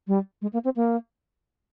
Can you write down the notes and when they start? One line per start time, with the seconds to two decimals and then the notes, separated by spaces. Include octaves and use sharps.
0.08 G3
0.42 G#3
0.53 A#3
0.64 C4
0.76 A#3